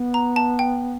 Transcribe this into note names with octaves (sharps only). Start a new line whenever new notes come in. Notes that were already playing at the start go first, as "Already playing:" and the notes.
Already playing: B3
A#5
A5
G5